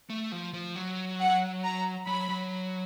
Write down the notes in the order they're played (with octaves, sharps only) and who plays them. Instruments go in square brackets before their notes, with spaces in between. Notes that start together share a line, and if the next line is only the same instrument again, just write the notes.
[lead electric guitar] A3
F3
F3
F#3
[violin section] F#5
A#5
[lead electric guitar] F#3 [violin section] B5
[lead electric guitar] F#3